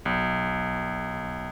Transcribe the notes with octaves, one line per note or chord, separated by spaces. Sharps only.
B1